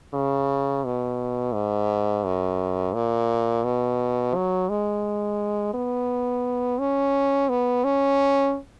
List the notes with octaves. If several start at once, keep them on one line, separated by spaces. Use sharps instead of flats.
C#3
B2
G#2
F#2
A#2
B2
F#3
G#3
B3
C#4
B3
C#4